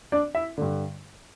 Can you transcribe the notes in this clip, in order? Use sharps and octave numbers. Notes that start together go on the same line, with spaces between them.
D4 D5
E4 E5
G2 D3